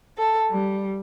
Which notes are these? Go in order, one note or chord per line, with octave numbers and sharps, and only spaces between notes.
A4
G3